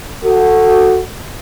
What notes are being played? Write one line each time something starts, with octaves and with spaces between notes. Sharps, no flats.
F#4 A4